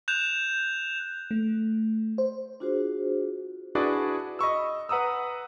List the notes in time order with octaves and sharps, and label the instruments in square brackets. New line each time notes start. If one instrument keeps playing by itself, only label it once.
[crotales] F#6 G6 E7 F7
[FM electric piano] A3
C5
[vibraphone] D4 F4 F#4 G#4 C5
[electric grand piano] D4 E4 F#4 G#4 B4 D5
D#5 B5 C#6 E6
B4 F#5 A#5 D#6 E6